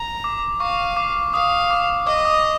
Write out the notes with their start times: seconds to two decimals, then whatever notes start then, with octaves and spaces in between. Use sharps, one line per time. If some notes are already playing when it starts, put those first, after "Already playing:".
Already playing: A#5
0.24 D6
0.60 F5 C#6
0.97 D6
1.34 F5 D#6
1.71 D6
2.07 D#5 D6
2.25 D#6